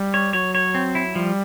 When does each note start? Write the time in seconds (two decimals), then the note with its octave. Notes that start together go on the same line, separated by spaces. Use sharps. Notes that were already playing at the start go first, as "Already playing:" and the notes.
Already playing: G3
0.14 C#5
0.33 F#3 C#5
0.55 C#5
0.75 C4
0.95 E4
1.14 F3 G3